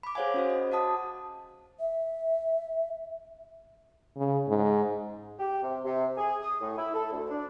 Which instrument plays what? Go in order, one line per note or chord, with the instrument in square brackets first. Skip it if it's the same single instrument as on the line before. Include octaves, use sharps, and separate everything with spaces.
[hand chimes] B5 D6
G#4 C5 C#5 F5 F#5 G#5
C#4 F#4 C5
D#5
F#4 F#5 A5 D#6
[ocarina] E5
[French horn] C#3
G#2
[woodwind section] G4
C3
C3
G#4
D#6
A2
E4
A4
D2
D4